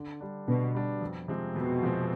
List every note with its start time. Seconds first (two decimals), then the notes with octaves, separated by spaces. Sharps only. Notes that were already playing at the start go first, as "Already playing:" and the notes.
Already playing: D3
0.21 G3 D4
0.48 B2 D3
0.75 G3 D4
1.01 F2
1.28 C3 F3 G#3 C4
1.56 F2 B2
1.82 C3 F3 G#3 C4